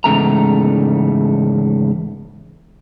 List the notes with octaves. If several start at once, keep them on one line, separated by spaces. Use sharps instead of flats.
E2 G#2 C#3 A3 A#5